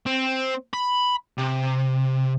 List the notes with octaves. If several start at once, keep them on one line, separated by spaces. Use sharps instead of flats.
C4
B5
C3